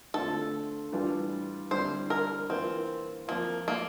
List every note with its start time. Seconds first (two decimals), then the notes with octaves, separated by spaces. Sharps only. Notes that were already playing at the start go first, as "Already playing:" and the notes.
0.14 D3 A3 C4 F4 A4
0.92 A2 E3 G3 D4 F4
1.71 D3 G3 C4 E4 C5
2.10 A#4
2.50 E3 A#3 C4 F4
3.28 F3 A#3 C4 F4
3.68 A#3